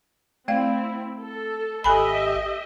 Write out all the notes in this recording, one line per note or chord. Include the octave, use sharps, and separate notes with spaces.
A3 C4 E4 D5 F5
A4
G#1 G4 A4 D#5 E5 G#5 B5